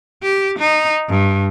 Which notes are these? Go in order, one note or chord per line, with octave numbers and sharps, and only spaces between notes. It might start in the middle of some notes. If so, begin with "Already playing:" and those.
G4
D#4
G2